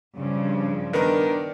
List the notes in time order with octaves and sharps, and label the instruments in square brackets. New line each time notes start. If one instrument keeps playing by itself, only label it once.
[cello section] G2 C#3 F3
[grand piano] D#3 B3 A#4 [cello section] D4